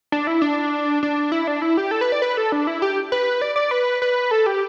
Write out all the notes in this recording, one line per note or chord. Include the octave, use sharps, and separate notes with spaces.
D4
E4
D4
D4
E4
D4
E4
G4
A4
B4
D5
B4
A4
D4
E4
G4
B4
D5
D5
B4
B4
A4
G4